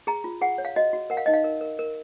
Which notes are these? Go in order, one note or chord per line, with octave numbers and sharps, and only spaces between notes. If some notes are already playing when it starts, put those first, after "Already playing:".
G#4 A#5
F4
G#4 F#5
C#5
F5
F#4 D#5
F#4
A#4 F#5
F5
D#4 D#5
F5
A#4
A#4
A#4